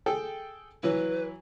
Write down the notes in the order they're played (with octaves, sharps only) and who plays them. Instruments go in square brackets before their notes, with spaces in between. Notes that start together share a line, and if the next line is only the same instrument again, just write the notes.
[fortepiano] G#4 A4 G5
[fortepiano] E3 F#3 E4 [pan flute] B4